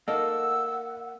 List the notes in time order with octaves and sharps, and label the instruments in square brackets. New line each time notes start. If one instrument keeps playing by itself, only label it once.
[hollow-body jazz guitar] A#3 [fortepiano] D#4 A4 [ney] F#5 [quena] E6